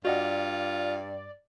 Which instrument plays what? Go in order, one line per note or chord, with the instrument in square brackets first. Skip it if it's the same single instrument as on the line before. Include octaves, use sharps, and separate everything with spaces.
[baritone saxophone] G2 [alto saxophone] F4 [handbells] F#4 D#5 F#5 [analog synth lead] D5